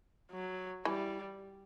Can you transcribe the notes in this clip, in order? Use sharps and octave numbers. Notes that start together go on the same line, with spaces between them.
F#3
E3 G3